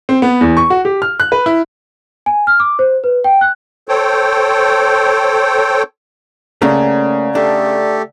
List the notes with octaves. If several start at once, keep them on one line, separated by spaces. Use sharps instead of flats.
C4
B3
E2
C#6
F#4
G4
F6
F#6
B4
E4
G#5
F6
D6
C5
B4
G5
F#6
A4 C5 C#5 G5
C#3 A3 A#3 C#4 D5 F#5 A#5
A3 D4 G4 A4